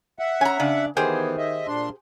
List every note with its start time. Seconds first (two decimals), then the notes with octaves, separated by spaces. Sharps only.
0.19 E5 F#5
0.41 C#4 G#5 A#5
0.60 C#3 D4
0.97 D#3 E3 B3 G4 G#4 C5
1.38 D#5 E5
1.67 A#2 D4 C6